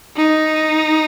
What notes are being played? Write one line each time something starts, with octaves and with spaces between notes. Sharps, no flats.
D#4